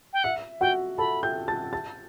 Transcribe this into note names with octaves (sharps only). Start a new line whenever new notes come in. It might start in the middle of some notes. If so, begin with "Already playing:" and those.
G5
E5 F#5
F#4 F#5 G5
A4 A5 B5
G5 G6
A5 A6
A5 A6